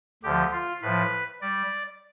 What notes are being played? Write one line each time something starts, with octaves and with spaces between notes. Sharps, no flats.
D2 D3 F3 G4
F4
A2 F3 B4
G3 D5